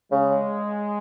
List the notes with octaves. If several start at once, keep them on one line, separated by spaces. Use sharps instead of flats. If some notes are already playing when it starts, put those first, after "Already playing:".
C#3 G#3